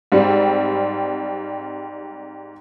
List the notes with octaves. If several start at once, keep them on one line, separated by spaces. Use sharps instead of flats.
G#2 G3 C4